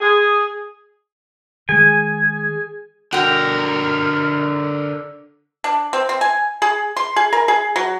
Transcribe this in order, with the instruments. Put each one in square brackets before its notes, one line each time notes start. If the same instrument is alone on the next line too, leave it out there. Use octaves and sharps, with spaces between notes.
[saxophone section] G#4
[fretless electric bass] D#3 G#3 [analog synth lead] G#4 [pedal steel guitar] G#5
[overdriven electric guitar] D3 A#4 [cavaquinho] F#4 G5
[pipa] D4
C4
C4
G#5
G#4
C6
G#4
A#4
G#4
F#3